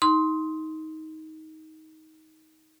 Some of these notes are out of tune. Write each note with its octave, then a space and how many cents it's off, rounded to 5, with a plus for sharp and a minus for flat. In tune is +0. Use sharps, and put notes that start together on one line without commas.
D#4 +20 C6 +0